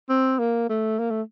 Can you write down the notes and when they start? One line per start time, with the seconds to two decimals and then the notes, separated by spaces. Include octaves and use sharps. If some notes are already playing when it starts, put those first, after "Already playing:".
0.09 C4
0.39 A#3
0.69 A3
0.99 A#3
1.10 A3